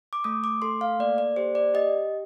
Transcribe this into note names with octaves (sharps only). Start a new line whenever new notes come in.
D6
A3 D#6
D6
A4 C6
F5
A#3 D5
D5
G4 C5
D5
G4 D#5